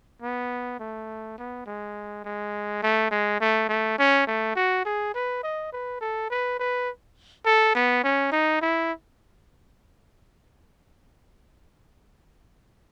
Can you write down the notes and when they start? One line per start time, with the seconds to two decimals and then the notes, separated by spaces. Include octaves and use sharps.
0.22 B3
0.79 A3
1.38 B3
1.66 G#3
2.24 G#3
2.83 A3
3.11 G#3
3.41 A3
3.69 A3
3.98 C#4
4.27 A3
4.56 F#4
4.85 G#4
5.15 B4
5.43 D#5
5.73 B4
6.01 A4
6.30 B4
6.59 B4
7.46 A4
7.75 B3
8.04 C#4
8.32 D#4
8.62 E4